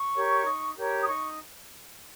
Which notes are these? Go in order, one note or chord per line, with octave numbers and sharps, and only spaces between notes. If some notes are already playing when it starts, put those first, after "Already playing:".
Already playing: C#6
G4 A#4 C#5
D#4
G4 A#4 C#5
D#6
D#4 C#6